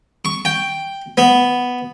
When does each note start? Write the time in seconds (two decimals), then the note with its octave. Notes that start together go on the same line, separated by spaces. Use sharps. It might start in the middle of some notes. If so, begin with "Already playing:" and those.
0.25 C#6
0.45 G5
1.18 B3